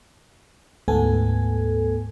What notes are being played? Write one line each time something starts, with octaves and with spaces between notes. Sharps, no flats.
D2 G#2 A3 B3 A4 G#5